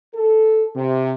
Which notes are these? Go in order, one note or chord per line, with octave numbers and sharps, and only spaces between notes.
A4
C3